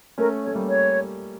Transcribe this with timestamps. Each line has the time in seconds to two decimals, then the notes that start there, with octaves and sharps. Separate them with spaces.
0.18 A3 C#4 A#4
0.43 C#5
0.47 A3
0.55 G3 A#3
0.68 C#5